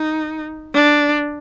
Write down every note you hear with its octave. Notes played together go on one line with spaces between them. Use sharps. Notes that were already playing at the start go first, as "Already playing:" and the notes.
Already playing: D#4
D4